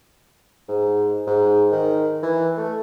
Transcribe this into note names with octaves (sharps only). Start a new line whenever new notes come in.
G#2
G#2
D#3
E3
A3